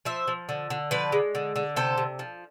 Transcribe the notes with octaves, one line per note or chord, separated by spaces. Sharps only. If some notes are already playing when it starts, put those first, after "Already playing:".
F3 C5 E5
F3
D3
D3
F3 B4 D5
G#3
D3
D3
C3 A4 C5
C3
F3